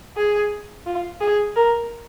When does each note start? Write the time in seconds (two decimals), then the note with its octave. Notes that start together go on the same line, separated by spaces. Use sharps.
0.17 G#4
0.86 F4
1.21 G#4
1.56 A#4